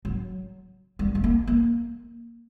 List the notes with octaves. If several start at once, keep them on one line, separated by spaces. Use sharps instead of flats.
F#3
G3
A3
A#3
A#3